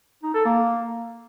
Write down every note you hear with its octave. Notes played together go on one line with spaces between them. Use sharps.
D#4
A4
A#3